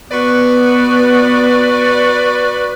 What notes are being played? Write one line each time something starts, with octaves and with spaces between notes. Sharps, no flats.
B3 F#4 B4 D5